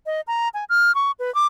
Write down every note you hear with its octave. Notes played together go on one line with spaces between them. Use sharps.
D#5
A#5
G#5
F6
C#6
B4
D6